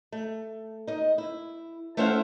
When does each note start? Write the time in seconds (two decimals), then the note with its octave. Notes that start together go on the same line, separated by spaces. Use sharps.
0.12 A3
0.87 D#4 D#5
1.18 E4
1.97 A3 C#4 E4 C5 F5 F#5